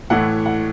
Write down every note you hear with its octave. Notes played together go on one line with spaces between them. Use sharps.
A2 E3 A3 F#5
F#5